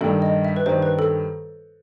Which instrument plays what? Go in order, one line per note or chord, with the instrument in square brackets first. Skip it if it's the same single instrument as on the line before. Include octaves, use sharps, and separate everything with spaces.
[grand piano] G2 D#3 G3 [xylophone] A4
[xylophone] D#5
E5
B4
[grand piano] G2 D#3 G3 [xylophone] C5
[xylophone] B4
A4